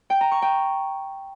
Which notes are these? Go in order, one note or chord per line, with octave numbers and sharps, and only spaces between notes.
G5
A#5
C#6
G5